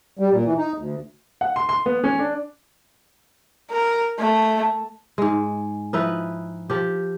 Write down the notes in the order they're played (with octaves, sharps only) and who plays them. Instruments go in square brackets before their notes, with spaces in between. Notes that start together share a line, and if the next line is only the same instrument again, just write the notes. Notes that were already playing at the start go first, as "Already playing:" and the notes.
[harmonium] G3
A#2
E3
D#4
D2
[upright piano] F#5
C6
C6
B3
C#4
D4
[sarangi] A#4
A3
[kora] G#2 G#3
F3 D#4 E4 B4
F3 G4